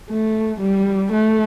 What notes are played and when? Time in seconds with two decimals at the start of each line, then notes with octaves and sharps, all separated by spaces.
0.10 A3
0.61 G3
1.12 A3